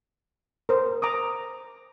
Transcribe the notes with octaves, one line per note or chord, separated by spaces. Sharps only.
A#4 C5
A#5 D6 D#6